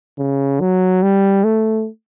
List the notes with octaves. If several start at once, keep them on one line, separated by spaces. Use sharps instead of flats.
C#3
F#3
G3
A3